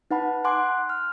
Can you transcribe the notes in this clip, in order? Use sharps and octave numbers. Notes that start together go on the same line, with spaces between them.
D#4 B4 F#5 A5 B5
F#5 G#5 C6 D6 F#6
F6